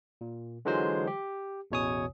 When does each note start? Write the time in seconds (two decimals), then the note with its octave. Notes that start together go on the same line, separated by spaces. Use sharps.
0.21 A#2
0.65 D3 E3 F#3 G#3 F4 C5
1.07 G4
1.71 A1 E2 B2 C#5 G#5 D#6